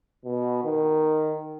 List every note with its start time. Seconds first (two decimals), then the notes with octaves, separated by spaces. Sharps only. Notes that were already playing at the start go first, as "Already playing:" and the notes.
0.24 B2
0.64 D#3